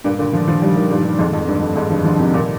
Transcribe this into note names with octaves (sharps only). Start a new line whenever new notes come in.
G2 A#2
A#2 D3
D3 F3
D3 F3
D#3 G3
D#3 G3
G2 A#2
G2
F2 G#2
F2
G2
F2
G2
F2 G#2
D3 F3
D3 F3
C3 D#3
A#2 D3